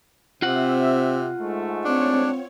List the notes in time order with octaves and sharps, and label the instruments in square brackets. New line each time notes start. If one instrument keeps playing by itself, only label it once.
[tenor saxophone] C3 [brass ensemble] C4 E5 [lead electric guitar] F4 F#5
[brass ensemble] G#2 G#3 A3
[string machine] C4 C#5 [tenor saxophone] D4